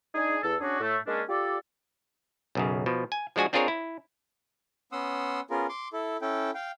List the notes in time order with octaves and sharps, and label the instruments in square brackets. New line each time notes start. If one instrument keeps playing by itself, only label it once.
[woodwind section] D4 D#4 G#4
E2 A4
C#4 D4 F#4 G#4 D5
A2 A3
G#3 A#3 C#4 D4
F4 G4 A4 D5
[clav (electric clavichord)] B1 F#2 C#3
B2 F3
G#5
F3 G#3 D4 F#4 G#5
C4 D4 F4 G#4 A#4 C#5
E4
[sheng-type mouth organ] B3 C#4 F#5 C6 D#6 E6
B3 C#4 F4 G#4 A#4
C6 D6
E4 A4
C#4 E4 A4 G5
F5 G5